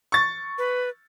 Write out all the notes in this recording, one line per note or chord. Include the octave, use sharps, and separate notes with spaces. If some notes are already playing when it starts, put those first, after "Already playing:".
C#6 A6
B4